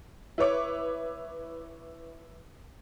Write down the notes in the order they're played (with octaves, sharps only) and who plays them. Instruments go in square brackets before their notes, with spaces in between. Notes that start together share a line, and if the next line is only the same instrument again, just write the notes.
[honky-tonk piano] E4 B4 C#5 D6